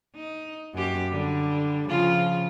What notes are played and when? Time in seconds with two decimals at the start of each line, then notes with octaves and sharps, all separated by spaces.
0.15 D#4
0.74 F#2 G4
1.11 D3 G3
1.88 C#3 F3 F4